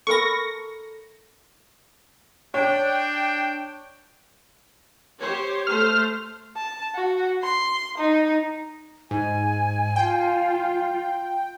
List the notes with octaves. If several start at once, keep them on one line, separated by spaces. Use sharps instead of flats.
A4 A#4 B5 C#6 A#6
D4 C#5 G5
G4 C5 C#5
A3 C5 F6
A5
F#4
C6
D#4
G#2 G#5
F4 G5